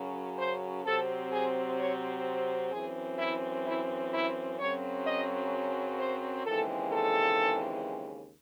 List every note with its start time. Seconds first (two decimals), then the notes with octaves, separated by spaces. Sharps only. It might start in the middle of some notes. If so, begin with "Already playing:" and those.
Already playing: F#2 C#3 F#3
0.38 C5
0.85 C3 F#3 C4 A4
1.32 G#4
1.78 C#5
2.72 F#2 E3 C4 G#4
3.18 E4
3.65 E4
4.12 E4
4.59 F#2 C#3 F#3 C4 C#5
5.06 D#5
5.99 C5
6.46 D#2 C#3 E3 G#3 C4 A4
6.93 A4